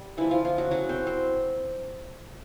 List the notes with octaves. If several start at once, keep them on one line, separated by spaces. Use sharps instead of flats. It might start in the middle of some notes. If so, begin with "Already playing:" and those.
Already playing: G3
D3 E3 F3 A#3 E4
F3 F4
F3 F4
F#3 F#4
C#3 E3 F#3 A3 F#4
C4 C5
C4 C5